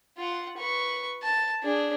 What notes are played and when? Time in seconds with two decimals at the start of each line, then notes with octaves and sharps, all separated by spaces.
0.18 F4 F#5
0.58 B4 C#6
1.23 A5
1.63 D4 G#4